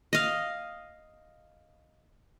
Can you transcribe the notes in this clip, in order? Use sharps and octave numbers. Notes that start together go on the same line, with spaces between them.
D#5 F5